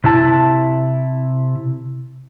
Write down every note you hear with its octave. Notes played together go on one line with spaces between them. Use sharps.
C3 E4 A5